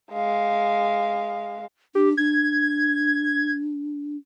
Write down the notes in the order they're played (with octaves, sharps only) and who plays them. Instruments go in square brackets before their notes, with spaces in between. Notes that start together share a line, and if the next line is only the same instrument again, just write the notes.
[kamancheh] G#3 F5
[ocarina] D4 [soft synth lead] G4
[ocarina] D4 [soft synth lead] G#6